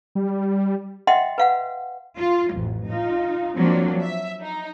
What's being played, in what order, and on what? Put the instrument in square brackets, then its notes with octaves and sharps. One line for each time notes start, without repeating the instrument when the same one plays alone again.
[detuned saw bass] G3
[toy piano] D#5 E5 F#5 G5 C6
B4 F5 F#5
[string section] F4
A1 F2
D#4 F4
F3 F#3 A#3 C4 D4
E5
D#4